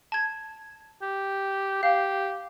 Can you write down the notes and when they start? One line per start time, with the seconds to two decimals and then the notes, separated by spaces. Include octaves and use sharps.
0.12 A5 G#6
1.02 G4
1.83 G4 F5